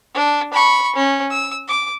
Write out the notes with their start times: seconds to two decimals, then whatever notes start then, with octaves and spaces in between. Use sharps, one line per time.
0.15 D4
0.53 B5 C#6
0.96 C#4
1.30 E6
1.68 D6